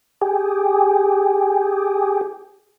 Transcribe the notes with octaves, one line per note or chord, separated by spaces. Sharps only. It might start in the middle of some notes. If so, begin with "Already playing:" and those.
G4 G#4